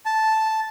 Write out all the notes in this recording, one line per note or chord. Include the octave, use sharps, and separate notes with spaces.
A5